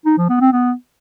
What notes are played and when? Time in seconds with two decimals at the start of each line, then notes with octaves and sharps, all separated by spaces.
0.06 D#4
0.17 F3
0.29 B3
0.41 C4
0.52 B3